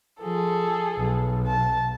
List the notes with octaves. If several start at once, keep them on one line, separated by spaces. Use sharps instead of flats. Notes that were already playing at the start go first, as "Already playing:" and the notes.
F3 G#4 A4
B1
A5